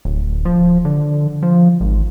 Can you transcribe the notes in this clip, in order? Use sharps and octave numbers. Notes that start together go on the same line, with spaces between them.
D1
F3
D3
F3
G#1